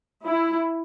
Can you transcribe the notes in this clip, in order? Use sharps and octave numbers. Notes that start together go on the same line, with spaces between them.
E4